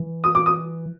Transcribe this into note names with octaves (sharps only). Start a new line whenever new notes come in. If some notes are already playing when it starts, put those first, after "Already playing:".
Already playing: E3
D#6
D6
D#6